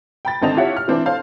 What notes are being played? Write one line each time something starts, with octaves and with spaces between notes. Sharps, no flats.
G5 B5 A6
G#1 D3 C4 D#5 A5 F7
E4 F4 G4 C#5 E5 F#5
F6
E3 C4 D4 E4
A4 C5 F5 A5